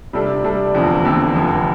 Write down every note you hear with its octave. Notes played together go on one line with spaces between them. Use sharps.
C3 G3 D4 A4
C3 G3 D4 A4
F1 E2 D3 F3 C4
F1 E2 D3 F3 C4
F1 E2 D3 F3